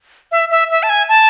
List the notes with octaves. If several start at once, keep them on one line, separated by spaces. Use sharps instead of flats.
E5
E5
E5
A5
G#5
A5